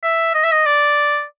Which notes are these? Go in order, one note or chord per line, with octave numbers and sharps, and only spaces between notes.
E5
D#5
E5
D#5
D5